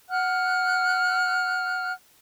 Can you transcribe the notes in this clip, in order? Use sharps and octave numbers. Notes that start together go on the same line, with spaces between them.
F#5 F6 F#6